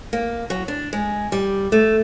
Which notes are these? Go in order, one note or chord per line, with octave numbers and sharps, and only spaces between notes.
A#3
F#3
D4
G#3
G3
A3